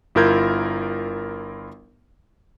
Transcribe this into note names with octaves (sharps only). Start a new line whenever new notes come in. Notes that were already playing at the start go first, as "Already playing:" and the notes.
G1 E4 F4 A#4 G6 G#6